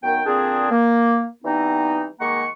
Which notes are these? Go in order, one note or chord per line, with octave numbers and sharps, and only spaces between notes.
F#2 D#3 B3 G5
A#2 D3 C4 D4 G#4
A#3
E3 G3 B3 C4 D#4
D#3 G#3 A#3 F#5 A#5 C#6